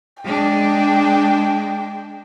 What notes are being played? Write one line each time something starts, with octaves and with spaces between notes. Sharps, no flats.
G#3 D4 G5